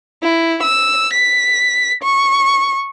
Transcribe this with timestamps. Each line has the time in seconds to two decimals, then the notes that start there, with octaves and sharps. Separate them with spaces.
0.23 E4
0.63 E6
1.13 B6
2.03 C#6